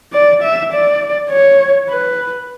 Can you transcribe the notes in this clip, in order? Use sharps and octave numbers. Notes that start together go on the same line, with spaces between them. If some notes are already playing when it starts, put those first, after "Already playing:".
D5
E5
D5
C#5
B4